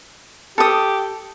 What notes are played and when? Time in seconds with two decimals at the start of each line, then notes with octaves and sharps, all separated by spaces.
0.58 G4 A4 D#6